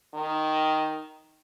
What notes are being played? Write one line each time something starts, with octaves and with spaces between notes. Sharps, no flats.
D#3